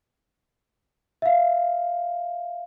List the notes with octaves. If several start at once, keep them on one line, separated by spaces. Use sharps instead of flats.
E5 F5